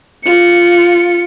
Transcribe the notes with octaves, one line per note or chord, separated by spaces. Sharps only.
F4 C#7